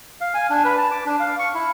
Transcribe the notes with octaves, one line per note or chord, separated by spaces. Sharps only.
F5
G#5
D4
B4
A5
D6
D4
F5
C#6
E4